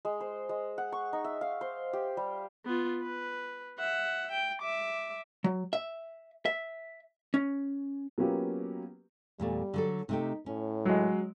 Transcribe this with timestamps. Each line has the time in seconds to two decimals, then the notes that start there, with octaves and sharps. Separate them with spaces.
0.05 G#3
0.20 C5
0.49 G#3
0.78 F#5
0.92 C#6
1.13 D#4
1.24 E5
1.41 F5
1.61 C5
1.93 G4
2.17 G3
2.65 B3 F4
3.02 B4
3.79 E5 F#5
4.32 G5
4.62 E5 D6
5.44 F#3
5.73 E5
6.45 E5
7.34 C#4
8.18 F#3 A#3 B3 C#4 F4 G4
9.40 E2 A#2 G3 A3
9.74 D3 F#3 A4
10.09 C3 A3 D#4 G4
10.46 A2 C#4
10.85 F#3 G#3